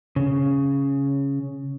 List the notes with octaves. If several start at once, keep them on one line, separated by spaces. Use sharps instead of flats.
C#3